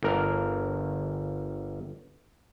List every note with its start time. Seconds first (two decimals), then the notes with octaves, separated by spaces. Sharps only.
0.03 G1 A#4